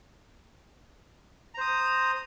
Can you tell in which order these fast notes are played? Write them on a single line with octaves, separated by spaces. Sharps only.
A#5 C5 D#6